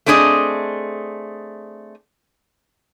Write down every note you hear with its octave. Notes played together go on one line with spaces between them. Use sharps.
A3 C4 D4 G#4 D5 D#5